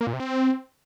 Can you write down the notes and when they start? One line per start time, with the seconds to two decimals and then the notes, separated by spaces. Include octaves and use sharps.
0.01 A#3
0.07 A#2
0.13 C3
0.20 C4